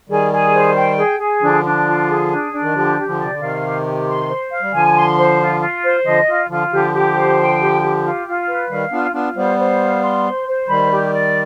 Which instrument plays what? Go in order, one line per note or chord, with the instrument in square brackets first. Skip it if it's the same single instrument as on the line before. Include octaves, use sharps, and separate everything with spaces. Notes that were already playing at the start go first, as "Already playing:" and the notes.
[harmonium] D#3 G3 [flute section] G#4
[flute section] G#4
C5
G5
G#4
G#4
[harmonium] D3 F3 [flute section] D4
[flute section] D4
F4
G#4
D4
D4
[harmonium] D#3
[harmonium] D3 F3 [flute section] G4
[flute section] G4
[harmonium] D3 F3
[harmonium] C3 [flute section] D5
[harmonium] D3
[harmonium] C3 D#3 [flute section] F5
[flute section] G4
G4
C6
C5
F5
[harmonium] G3
[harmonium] D3 F3 [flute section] G#5
[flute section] C6
C5
F4
F4
C5
[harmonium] D3 F3 [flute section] D#5
[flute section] F4
[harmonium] D3 F3 [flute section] F4
[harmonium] D3 F3 [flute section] G4
[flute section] G4
C5
G5
G4
G4
F4
F4
B4
[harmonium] D#3 G3 [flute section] F5
[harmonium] B3 D4 [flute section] F4
[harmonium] B3 D4 [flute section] F4
[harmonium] G3 B3 [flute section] C5
[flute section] C5
F5
C6
C5
C5
[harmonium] D#3 G3 [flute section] B5
[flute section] G4
D5